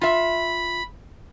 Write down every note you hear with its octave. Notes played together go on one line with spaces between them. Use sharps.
F4 E5 B5